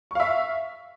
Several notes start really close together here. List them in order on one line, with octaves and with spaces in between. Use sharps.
C#6 F5 E5